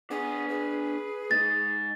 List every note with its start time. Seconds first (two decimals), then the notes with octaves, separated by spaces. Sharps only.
0.11 B3 D4 G#4 G#5
0.50 G#4 B4
1.31 G#3 D#4 A6